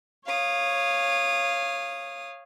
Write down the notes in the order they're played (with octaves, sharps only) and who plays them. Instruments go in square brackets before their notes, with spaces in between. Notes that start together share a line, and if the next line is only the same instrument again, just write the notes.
[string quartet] C#5 F5 D#6